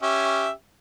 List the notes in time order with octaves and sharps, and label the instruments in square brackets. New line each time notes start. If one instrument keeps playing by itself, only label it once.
[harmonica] C#4 G4 E5